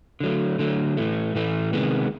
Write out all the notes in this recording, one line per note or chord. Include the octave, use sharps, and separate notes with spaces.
D3 F#3 A3
D3 F#3 A3
A2 E3 A3
A2 E3 A3
C3 D#3 G#3 B3